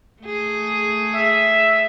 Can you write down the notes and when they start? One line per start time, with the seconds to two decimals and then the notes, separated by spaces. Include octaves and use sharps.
0.22 A3 G#4
1.14 E5